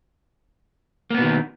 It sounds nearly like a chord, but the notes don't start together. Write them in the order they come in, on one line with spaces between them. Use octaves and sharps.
A#3 B3 B2 D#3